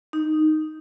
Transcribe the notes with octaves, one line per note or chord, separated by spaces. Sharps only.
D#4